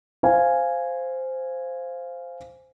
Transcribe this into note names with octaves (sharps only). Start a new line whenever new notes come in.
C5 F5 G#5